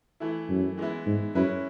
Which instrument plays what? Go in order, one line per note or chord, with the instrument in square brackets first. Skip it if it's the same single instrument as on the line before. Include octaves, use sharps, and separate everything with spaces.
[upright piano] E3 A3 E4
[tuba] F#2
[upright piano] E3 G#3 B3 E4
[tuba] G#2
[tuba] F#2 [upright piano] G#3 C#4 E4 B4